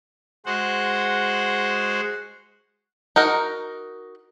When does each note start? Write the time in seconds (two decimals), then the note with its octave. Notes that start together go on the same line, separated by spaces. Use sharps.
0.46 G#3 F#4 C5 F#5
3.16 D#4 F#4 A#4